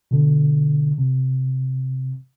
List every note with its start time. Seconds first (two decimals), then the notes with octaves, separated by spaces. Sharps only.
0.11 B2 D3
0.98 C3